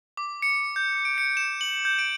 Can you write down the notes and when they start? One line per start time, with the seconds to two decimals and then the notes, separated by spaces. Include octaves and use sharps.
0.17 D6
0.42 C#7
0.76 G6
1.05 D7
1.18 C#7
1.37 E7
1.61 F#7
1.85 G6
1.99 D7